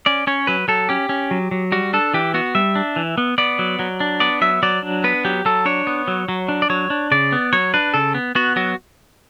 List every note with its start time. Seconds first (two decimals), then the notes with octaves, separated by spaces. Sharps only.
0.06 C#4 D5
0.27 C#4 C#5
0.47 F#3 B4
0.68 F#3 A4
0.89 C#4 G4
1.09 C#4
1.31 F#3
1.51 F#3
1.72 G3 F#4
1.93 D4 A4
2.14 E3 G4
2.34 B3 F#4
2.55 G3 E5
2.75 D4
2.96 E3
3.18 B3
3.38 B3 D5
3.59 F#3
3.79 F#3
4.00 D4
4.20 B3 D5
4.41 F#3 E5
4.63 F#3 D5
4.83 D4
5.04 B3 B4
5.25 F#3 G4
5.45 F#3 A4
5.65 D4 C#5
5.87 B3
6.08 F#3
6.29 F#3
6.49 D4
6.62 D5
6.70 F#3 C#5
6.90 D4
7.11 C#3 D5
7.32 B3
7.53 F#3 C#5
7.74 D4 B4
7.94 C#3 A4
8.14 B3
8.35 B3 F#4
8.56 F#3 F#4